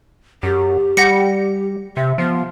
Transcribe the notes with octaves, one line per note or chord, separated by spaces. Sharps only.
F#2 G4
G3 F#5 A#6 C#7
C3 E5
F3 B3